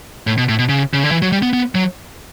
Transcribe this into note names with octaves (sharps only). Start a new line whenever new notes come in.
A2
B2
A2
B2
C#3
C#3
D3
E3
F#3
G3
B3
B3
F#3